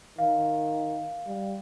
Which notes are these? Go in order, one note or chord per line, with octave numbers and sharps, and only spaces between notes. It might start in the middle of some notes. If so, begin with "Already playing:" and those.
D#3 F5
G3